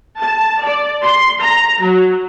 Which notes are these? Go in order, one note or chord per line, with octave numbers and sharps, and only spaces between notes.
A5
D5
C6
A#5
F#3